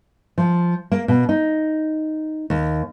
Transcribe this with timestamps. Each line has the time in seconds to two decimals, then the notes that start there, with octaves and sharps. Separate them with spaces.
0.38 F3
0.92 A#3
1.08 B2
1.29 D#4
2.50 D#2